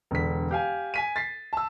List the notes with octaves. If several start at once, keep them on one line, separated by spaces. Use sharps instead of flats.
E1 D3 B6
G4 F5 G#5
G#5 B6 D#7
A6 B6 C7
A5 E6